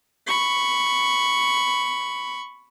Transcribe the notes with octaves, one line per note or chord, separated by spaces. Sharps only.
B5 C#6